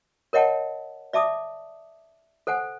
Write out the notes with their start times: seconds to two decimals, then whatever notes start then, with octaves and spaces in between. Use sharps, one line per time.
0.33 A#4 C#5 D#5 F#5 G5 A5
1.13 D5 E5 A5 D6 D#6
2.47 A4 C5 F#5 G#5